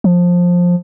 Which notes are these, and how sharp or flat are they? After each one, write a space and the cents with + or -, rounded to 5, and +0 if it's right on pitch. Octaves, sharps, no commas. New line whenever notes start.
F3 +15